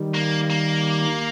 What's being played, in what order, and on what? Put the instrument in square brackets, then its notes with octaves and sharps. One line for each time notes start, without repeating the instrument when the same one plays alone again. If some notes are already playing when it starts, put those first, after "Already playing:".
Already playing: [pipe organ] D#3 G3
[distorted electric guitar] A#3
A#3